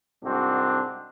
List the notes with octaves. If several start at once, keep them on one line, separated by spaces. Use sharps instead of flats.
C2 G#2 C4 D4 F#4